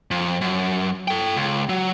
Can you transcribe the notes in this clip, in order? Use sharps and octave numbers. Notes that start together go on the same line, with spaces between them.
F2
F#2
A4 G5
C#2
F#3